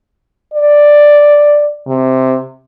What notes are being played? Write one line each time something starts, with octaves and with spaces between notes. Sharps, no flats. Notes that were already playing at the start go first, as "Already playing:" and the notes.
D5
C3